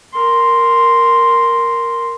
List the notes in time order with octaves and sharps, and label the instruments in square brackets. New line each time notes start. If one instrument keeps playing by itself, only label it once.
[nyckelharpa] A#4 C6